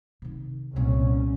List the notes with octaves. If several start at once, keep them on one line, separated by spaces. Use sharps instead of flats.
C3 D#3
C2 A#2 B3 C#4